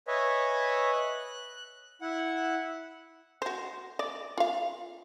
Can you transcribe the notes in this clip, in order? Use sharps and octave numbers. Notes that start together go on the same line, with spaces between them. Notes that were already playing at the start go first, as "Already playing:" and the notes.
B4 C#5 D#5 E5 G#5
F#6
E4 F#5
F#4 C5
D5
F4 F5